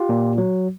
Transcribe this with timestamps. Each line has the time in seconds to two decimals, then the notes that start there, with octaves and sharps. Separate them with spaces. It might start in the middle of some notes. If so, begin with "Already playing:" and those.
Already playing: F4 G4
0.09 A#2
0.38 F#3